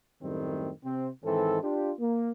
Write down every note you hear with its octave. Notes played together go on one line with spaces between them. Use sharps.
F#2 A2 D#3 G3 A3 C4
C3 C4
G#2 D#3 E3 C4 A4
D4 F4 G4
A#3